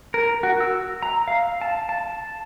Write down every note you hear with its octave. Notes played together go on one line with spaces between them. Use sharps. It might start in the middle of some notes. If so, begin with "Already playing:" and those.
A#4
F#4
E6
A#5
F5
A5
A5